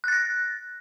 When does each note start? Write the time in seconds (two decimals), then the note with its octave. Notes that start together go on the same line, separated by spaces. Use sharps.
0.04 F#6
0.08 A6
0.12 A#6